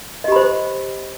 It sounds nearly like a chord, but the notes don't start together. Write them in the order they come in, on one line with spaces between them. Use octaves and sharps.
D#5 G4 B5 C5